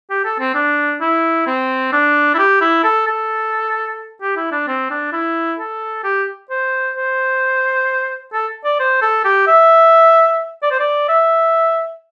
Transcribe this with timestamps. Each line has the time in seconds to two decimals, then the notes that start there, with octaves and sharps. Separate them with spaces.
0.10 G4
0.25 A4
0.40 C4
0.55 D4
1.01 E4
1.47 C4
1.93 D4
2.35 E4
2.39 G4
2.61 E4
2.84 A4
3.07 A4
4.22 G4
4.37 E4
4.52 D4
4.68 C4
4.91 D4
5.13 E4
5.59 A4
6.04 G4
6.50 C5
6.97 C5
8.33 A4
8.65 D5
8.80 C5
9.02 A4
9.25 G4
9.47 E5
10.63 D5
10.71 C5
10.80 D5
11.09 E5